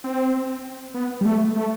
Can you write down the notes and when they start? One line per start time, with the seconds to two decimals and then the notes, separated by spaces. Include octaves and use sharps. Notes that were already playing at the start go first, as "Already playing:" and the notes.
0.04 C4
0.94 B3
1.21 G3
1.25 A3
1.56 A3